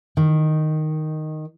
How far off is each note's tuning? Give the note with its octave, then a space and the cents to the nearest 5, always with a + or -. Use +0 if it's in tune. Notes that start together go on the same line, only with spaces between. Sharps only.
D#3 -5